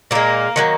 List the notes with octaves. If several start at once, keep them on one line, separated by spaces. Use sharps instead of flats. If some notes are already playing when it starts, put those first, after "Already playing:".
A#2 G#3 A#3
D#3 F#3 A#3